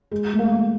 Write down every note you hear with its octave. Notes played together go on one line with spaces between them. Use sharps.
G#3
A3
A#3